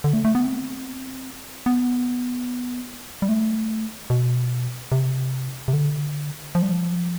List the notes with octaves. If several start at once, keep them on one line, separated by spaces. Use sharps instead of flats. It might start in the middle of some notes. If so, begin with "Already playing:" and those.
D3
A3
A3
B3
C4
B3
G3
A3
B2
C3
C3
D3
F3
G3
F3